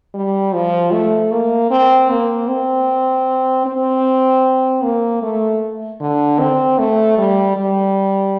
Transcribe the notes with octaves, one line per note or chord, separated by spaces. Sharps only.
G3
F3
A3
A#3
C4
A#3
C4
C4
A#3
A3
D3
C4
A3
G3
G3